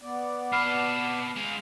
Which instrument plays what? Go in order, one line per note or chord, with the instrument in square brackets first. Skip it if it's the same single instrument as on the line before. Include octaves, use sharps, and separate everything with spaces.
[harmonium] B3 D5
[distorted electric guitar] B2 A5 [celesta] B5 F6 C7
[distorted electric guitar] G#3 F5